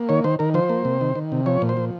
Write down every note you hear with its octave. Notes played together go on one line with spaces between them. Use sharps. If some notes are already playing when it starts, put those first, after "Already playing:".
Already playing: A#3
D#3 C#5
D#3 C5
D#3 A#4
F3 C5
A#3
C3
D#3
D#3
C3
F3 C#5
A#2
C5
F3